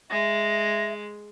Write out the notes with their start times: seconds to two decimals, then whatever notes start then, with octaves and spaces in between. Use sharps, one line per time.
0.10 G#3 E5 A#6